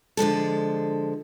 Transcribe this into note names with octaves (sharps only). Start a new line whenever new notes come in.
D3 F3 G#3 A4